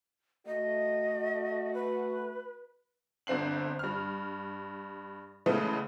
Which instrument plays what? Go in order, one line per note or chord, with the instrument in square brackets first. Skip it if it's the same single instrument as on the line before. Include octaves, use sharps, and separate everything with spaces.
[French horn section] A3 F#4 [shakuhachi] D#5
[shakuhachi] B4
[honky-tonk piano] G1 D3 C4 C7 F#7
G2 F6
C#3 E3 G#3 A3 B3